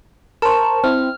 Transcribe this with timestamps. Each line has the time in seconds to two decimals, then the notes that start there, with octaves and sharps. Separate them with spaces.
0.42 A#4 C5 A5 C#6
0.84 C4 E4 F6